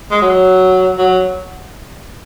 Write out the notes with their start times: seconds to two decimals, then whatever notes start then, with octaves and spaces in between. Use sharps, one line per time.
0.11 G#3
0.22 F#3
0.98 F#3